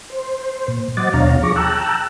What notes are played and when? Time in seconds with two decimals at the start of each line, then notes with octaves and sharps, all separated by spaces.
0.10 C5
0.68 A#2
0.97 F#3 C5 D#5 F#5 D6 A6
1.13 D#2 B2 D4 C#5 F5 A#5
1.43 F3 G#4 C#6 D6 A#6
1.56 G5 A5 A#5 E6 F#6